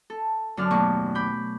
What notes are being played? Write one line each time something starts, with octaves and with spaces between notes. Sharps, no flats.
A4
F#2 D3 D4 D5 A5 F6
D#2 B2 A3 B3 D5 C#6
B5 C#6 D6 G6